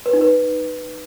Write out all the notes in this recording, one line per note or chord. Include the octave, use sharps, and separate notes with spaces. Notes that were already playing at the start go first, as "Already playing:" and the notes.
B4
D#4
B4